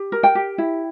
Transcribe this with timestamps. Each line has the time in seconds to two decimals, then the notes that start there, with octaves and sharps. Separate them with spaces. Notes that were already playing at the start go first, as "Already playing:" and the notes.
Already playing: G4
0.12 A#4
0.23 G5
0.35 G4
0.58 E4